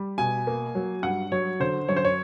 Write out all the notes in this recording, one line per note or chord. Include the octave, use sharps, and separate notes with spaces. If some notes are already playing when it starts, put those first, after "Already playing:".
Already playing: G3
B2 G#5
A#3
F#3
G2 F#5
F#3 C#5
D3 C5
F#2 C#5
C5
C#5